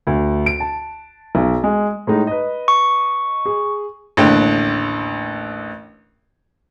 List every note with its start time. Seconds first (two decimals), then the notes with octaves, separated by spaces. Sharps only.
0.07 D2
0.46 D7
0.60 A5
1.35 B1
1.64 G#3
2.07 A2 G#3 D#4
2.27 B4 D#5
2.68 C#6
3.46 G#4
4.17 A1 D#2 D3 G5